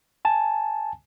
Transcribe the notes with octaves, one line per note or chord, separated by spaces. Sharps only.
G#5 A5